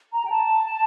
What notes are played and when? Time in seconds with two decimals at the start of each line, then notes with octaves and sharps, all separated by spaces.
0.12 A#5
0.25 G5
0.31 A5